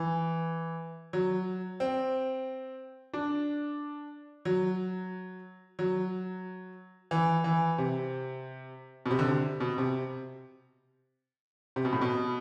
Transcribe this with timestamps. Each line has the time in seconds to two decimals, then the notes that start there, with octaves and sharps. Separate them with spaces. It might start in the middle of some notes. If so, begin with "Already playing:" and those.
Already playing: E3
1.13 F#3
1.80 C4
3.14 D4
4.45 F#3
5.79 F#3
7.11 E3
7.44 E3
7.78 C3
9.06 B2
9.11 C3
9.19 D3
9.28 C3
9.60 B2
9.78 C3
11.76 C3
11.85 B2
11.93 A2
12.01 B2